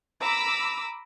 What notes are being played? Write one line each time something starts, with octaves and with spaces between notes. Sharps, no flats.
A#5 B5 D6 E6